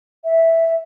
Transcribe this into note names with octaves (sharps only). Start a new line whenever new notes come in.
E5